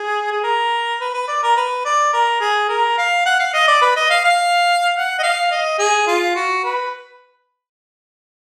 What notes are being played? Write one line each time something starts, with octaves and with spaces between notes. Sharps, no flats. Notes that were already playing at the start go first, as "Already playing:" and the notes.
Already playing: G#4
G#4
A#4
B4
B4
D5
A#4
B4
D5
A#4
G#4
A#4
F5
F#5
F5
D#5
D5
B4
D#5
F5
F5
F#5
D#5
F5
D#5
G#4
F4
F#4
B4